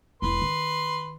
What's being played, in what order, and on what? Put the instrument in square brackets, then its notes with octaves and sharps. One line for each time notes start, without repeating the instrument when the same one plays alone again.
[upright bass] E1 E4 [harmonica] B4 C6
[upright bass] D#3